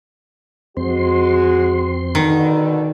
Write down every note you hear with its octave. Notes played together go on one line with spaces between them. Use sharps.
F2 G#3 C4 F#4 C6
B2 D3 D#3